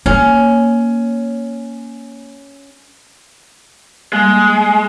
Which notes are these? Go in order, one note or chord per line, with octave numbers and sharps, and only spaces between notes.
A#3 C#4
G3 G#3 A#3